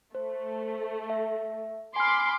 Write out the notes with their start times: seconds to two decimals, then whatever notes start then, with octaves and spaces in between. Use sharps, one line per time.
0.15 A3 C5
1.10 E5
1.96 G#5 B5 C6 D6 F6